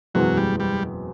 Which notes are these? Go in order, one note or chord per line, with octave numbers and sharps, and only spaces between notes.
F#1 E2 B2 F#3 G#3 C4
G3
G3